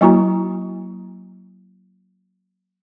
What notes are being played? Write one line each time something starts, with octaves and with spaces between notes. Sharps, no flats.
F#3 A#3 E4 F#4 A#5